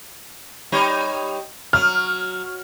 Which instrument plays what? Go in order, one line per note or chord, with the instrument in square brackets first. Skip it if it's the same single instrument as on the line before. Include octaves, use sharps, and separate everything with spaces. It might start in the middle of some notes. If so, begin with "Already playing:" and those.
[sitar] G3 D#4 C#5
[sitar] F#3 [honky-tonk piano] F6